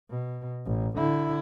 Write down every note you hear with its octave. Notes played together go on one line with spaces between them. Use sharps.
B2
A1
D3 E4